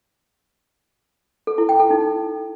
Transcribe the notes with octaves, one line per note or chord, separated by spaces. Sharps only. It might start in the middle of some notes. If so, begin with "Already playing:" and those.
A4
E4
G5
A4
D#4